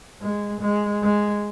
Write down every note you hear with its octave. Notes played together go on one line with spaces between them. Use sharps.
G#3
G#3
G#3